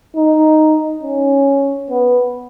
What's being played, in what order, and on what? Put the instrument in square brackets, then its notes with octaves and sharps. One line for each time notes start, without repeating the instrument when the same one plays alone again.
[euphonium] D#4
C#4
B3